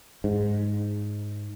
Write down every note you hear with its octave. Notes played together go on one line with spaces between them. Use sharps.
G#2